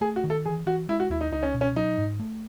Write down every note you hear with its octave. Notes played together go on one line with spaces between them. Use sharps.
A3 G#4
F#4
D#3
A4
E3 G#4
E3 F#4
G#3 E4
F#4
D#2 E4
D#4
C#2 D#4
C#4
B2
C#4
F#3 D#4
G#2
A3